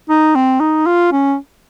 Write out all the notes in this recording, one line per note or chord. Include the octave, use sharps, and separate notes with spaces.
D#4
C4
D#4
F4
C#4